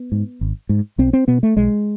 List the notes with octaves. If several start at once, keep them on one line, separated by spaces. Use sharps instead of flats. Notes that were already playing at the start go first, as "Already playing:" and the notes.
Already playing: B3
G#2
G#1
G#2
B1 C4
C4
B2 B3
A3
B1 G#3